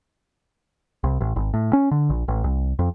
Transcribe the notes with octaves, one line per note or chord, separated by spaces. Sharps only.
C2
A1
G#1
A2
C#4
D3
A#1
A1
C2
F2